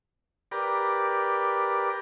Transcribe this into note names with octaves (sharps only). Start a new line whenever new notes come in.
G4 A#4 B4 D5